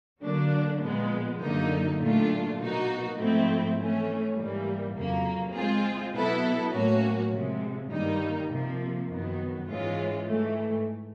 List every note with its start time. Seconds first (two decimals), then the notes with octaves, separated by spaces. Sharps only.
0.23 D3 F#3 A#3 D4
0.82 A#2 F3 G#3 B3
1.41 F#2 D3 F#3 A#3 D#4
2.00 A#2 F#3 A3 D4 F4
2.59 B2 F#3 A#3 D#4 F#4
3.18 G#2 F3 A3 C4 E4
3.77 E3 A3 C#4
4.36 G#2 E3 G3 A#3
4.95 F2 C#3 F#3 A#3
5.54 G#3 C4 F4 G#4
6.13 B2 F#3 B3 E4 A4
6.72 A2 F#3 A#3 C#4 F#4
7.31 C3 F3 G#3
7.90 G2 D#3 G3 A#3 D#4
8.49 C3 F3 A#3
9.08 F#2 D#3 F#3 B3
9.67 G#2 E3 G#3 C#4 F4
10.26 G#2 E3 A3